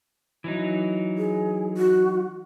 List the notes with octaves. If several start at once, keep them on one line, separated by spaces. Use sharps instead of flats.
E3 F#3 D#4
G#4
F#4